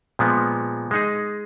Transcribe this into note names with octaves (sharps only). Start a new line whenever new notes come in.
A#2 F3 G#3 B3
G#3 D#4 G#4